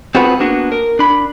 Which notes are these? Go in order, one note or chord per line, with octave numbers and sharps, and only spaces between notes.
C4 F4 F#4 G#4 B4
A#3 B3 D4 F#4
A#4
D4 B5